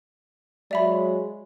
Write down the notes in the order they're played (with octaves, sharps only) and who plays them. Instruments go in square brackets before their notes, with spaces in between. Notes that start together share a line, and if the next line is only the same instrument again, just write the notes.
[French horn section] F#3 G#3 [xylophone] D5 E5 B5